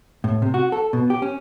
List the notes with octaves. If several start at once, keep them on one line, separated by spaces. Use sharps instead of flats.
A2
C3
F#4
A4
B2
G4
C#4